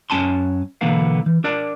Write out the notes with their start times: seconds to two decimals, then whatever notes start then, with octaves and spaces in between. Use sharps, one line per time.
0.10 F#2 C#4 G#5 A5 C6
0.81 B1 D3 E3 A#3 B3 F5
1.26 E3
1.44 D4 A#4 D5